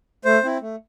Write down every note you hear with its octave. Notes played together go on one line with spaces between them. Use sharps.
A3 C5
C4 E4
A3